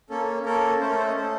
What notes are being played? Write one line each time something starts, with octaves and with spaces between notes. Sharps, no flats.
A#3 C#4 A4
A#3 C#4 A4 A#4
A3 C#4 A4 C5
A#4
C5
D#5
A3 C#4 A4 C5